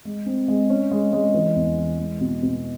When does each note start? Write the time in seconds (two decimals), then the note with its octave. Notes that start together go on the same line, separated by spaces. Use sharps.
0.05 G#3
0.26 C4
0.48 G#3
0.70 C#4
0.91 G#3
1.13 G#3
1.34 E3
1.56 E2
1.77 E3
1.99 G#3
2.21 B2
2.42 B2